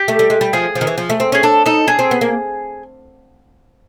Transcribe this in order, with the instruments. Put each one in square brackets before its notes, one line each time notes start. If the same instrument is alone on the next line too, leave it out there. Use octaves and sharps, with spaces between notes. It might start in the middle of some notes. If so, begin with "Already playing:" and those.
Already playing: [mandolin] G4
[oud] A3
G3
G#3
G3
[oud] F3 [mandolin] G#4
[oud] F3
D#3
E3
F3
A3
C4
[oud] C#4 [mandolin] G#4
[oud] D4 [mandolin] A4
[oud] D#4 [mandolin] A4
[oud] D4 [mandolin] G#4
[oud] C4
B3
A#3